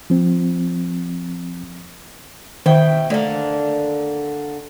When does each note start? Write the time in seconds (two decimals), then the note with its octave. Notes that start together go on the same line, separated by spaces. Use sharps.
0.10 F3 C4
2.66 B2 D#3 E4 G5
3.10 D3 A3 A#3 D5